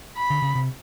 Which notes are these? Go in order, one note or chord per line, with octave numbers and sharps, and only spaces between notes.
B5
D3
C#3
C3